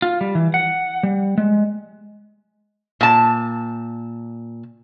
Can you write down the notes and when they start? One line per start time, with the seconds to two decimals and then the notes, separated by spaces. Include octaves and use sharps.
0.02 F4
0.21 G3
0.35 E3
0.54 F#5
1.03 G3
1.38 G#3
3.01 A#2 A5